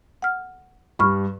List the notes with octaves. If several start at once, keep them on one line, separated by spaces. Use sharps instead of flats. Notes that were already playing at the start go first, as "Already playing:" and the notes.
F#5 F6
G2 G3 B5 C#6 F6